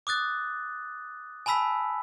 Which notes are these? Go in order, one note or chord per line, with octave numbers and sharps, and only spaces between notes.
D6 D#6 F#6 A6
G#5 A5 B5 E6 B6